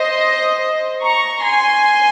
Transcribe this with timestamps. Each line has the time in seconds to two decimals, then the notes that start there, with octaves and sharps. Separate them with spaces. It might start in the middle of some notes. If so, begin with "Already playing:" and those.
Already playing: C5 D#5
1.03 A#5 C#6
1.43 G#5 C6